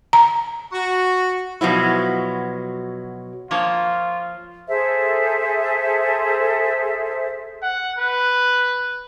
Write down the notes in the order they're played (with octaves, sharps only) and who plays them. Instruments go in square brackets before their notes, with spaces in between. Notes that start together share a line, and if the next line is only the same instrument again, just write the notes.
[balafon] A#5
[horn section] F#4
[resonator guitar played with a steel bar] B2 F3 F#3 E4
[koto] F3 A#3 C#5 [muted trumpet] F4
[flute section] G#4 A4 C5 E5
[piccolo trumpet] F#5
B4